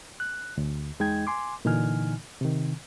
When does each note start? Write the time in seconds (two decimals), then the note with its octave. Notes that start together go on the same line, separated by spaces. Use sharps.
0.20 F#6
0.58 D2
1.00 E2 G#3 D#4 G5 G#6
1.27 G#5 C6 D6
1.65 A#2 D3 E3 D#4 G#5 F6
2.41 C3 D#3